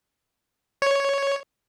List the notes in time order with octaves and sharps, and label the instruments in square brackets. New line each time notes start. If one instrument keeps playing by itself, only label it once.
[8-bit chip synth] C#5